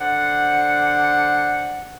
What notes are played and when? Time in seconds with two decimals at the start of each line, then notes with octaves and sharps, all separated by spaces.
0.01 D3 C5 D5 F#5